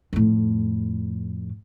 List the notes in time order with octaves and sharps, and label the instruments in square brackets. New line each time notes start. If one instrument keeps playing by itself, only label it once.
[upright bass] F2 A2